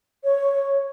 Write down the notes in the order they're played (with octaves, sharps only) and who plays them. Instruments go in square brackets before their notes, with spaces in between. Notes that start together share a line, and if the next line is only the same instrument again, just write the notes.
[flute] C#5